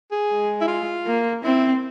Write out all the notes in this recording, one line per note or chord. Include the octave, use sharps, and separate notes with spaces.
G#4
G#3
E4
F4
A#3
C4 E4